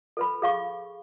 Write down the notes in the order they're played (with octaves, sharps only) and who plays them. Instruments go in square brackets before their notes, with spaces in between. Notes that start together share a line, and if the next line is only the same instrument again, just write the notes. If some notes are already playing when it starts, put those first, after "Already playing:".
[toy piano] A4 B4 B5
G#4 F5 C#6